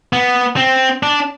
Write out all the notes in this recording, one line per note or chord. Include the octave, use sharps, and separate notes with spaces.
B3
C4
D4